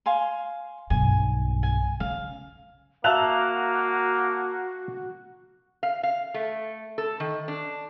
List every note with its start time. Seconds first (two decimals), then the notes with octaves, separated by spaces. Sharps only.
0.06 F5 G#5 C6
0.90 B1 G2 G#5
1.63 G#5
2.00 C#3 F5
3.04 A#3 F#4 E5 F5 A5 F#6 F7
5.83 F5
6.03 F5
6.34 A3
6.98 A4
7.20 D#3
7.48 D4